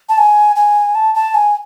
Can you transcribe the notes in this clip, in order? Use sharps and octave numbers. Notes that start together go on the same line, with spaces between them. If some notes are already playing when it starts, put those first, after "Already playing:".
A5
G#5
G#5
A5
A5
G#5